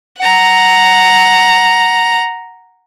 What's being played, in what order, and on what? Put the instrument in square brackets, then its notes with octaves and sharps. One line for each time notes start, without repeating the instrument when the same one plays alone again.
[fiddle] F#5 A#5